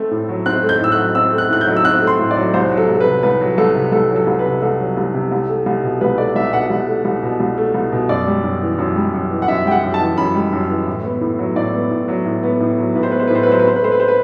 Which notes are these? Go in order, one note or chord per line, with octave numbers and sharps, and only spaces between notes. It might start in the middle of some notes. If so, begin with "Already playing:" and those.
Already playing: A3 C4
A2
F#3
C4 F#6
A3
G6
A2 E6
F#6
F#3
C4 E6
A3
F#6
A2 F#6
G6
F#3
E6
C4 F#6
A3
C6
A2
D5
F#3
C2 C5
F#3
A4
C2
A4
B4
C3
C2 B4
F#3
C2 A4
C3
C2 A4
F#3
A4
C2
B4
C3
C2 A4
F#3
C2
C3
C2
A3
C2
B2
C2 B4
A3 D5
C2 E5
B2 F#5
C2
A3
C2
B2
C2
A3
C2
B2
F#2 D5
G3
F#2
E3
F#2
G3
F#2
E3
F#5
F#2 E5
G3 G5
F#5
F#2
A5
E3
F#2 B5
G3
F#2
E3
A2
B3
A2
F#3
A2 D5
B3
A2
F#3
A2
B3
A2
F#3
A2 B4
C5
B3 B4
C5
A2 B4
C5
B4
F#3 C5
B4
C4 C5
B4
A3 C5
B4
C5
B4